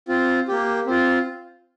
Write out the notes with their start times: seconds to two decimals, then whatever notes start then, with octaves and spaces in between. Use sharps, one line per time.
0.08 C4 F4
0.48 A#3 G4
0.86 C4 F4